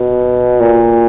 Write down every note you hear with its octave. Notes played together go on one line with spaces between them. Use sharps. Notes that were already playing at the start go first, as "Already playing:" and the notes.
Already playing: B2
A#2